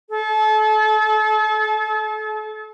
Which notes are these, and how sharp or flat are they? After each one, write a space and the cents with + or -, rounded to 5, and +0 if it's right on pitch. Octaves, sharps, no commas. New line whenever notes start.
A4 -35